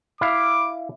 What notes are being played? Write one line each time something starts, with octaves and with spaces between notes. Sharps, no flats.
E4 F5 D6